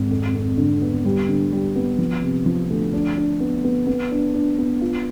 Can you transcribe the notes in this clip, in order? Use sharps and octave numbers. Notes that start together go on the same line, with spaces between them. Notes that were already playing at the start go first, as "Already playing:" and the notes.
Already playing: G#1
F2
F2
D3
B3
G3
D3
G3
B3
F3
C3
F3
D2
D4
D4
B3
B3
B3
D4
D4
B3
F4